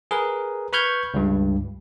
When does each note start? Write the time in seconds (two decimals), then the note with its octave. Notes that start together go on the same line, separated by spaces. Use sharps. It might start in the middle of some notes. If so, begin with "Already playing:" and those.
0.11 G#4 A#4 B4
0.73 B4 B5 C#6 F6 G6 G#6
1.14 C#2 G2